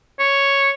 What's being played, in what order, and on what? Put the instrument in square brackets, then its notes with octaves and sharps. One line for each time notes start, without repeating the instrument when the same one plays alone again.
[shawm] C#5